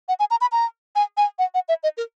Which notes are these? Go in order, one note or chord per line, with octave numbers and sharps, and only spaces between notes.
F#5
G#5
A#5
B5
A#5
G#5
G#5
F#5
F#5
E5
D#5
A#4